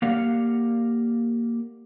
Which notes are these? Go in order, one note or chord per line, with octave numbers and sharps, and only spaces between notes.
A#3 G4 A#4 D5 F5 F#5